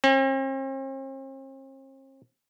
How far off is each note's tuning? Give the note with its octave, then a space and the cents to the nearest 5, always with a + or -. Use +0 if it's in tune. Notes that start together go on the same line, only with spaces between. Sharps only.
C4 +45